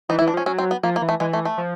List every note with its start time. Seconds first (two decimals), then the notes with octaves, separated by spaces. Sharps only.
0.09 E3 D#4
0.19 E4
0.21 E3
0.28 D4
0.34 F3 C#4
0.46 F#3 C#4
0.58 C4
0.71 B3
0.83 F3 A#3
0.96 A#3
1.02 E3
1.09 A3
1.20 E3 G#3
1.33 A3
1.45 A3
1.58 F3